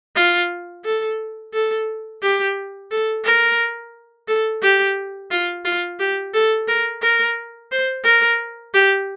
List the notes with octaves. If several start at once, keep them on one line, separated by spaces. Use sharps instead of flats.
F4
A4
A4
G4
A4
A#4
A4
G4
F4
F4
G4
A4
A#4
A#4
C5
A#4
G4